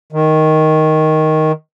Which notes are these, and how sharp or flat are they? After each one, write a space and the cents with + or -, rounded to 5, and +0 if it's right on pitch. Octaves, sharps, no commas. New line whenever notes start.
D#3 +5